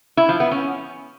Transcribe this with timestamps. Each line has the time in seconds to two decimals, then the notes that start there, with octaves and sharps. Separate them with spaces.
0.17 E4
0.29 F3
0.40 B3
0.51 C#4